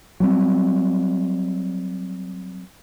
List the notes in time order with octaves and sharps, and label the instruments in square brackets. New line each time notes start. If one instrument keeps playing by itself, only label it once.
[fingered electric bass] F#3 G3 C4